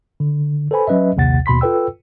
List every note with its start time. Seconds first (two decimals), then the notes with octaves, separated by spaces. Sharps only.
0.20 D3
0.71 A4 B4 C5 G#5 B5
0.87 F#3 C#4 B4 D#5 E5
1.16 A#1 D#2 C3 F#5 A6
1.46 D#2 B2 B5 C6 B6
1.61 F4 A4 B4 G5 E6